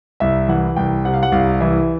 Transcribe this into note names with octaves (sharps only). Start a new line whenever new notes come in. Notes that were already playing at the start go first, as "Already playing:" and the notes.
C2 E5
E3 F#5
C2 G5
C3 F#5
F5
F#5
C2 F5
E3 E5